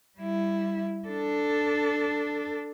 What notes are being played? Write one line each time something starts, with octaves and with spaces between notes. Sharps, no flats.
G3 E4
D4 A4